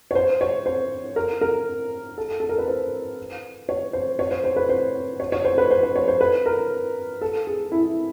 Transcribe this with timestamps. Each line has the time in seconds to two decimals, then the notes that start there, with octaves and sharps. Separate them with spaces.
0.11 C#5
0.15 C5
0.41 C#5
0.66 C5
1.16 A#4
1.41 A#4
2.18 A4
2.40 A4
2.49 A#4
2.58 B4
2.68 C5
3.69 C#5
3.93 C5
4.19 C#5
4.31 C5
4.44 C5
4.56 B4
4.69 C5
5.20 C#5
5.32 C#5
5.45 C5
5.58 B4
5.70 C5
5.83 C5
5.96 C#5
6.08 C5
6.21 B4
6.46 A#4
7.21 A4
7.47 G#4
7.72 E4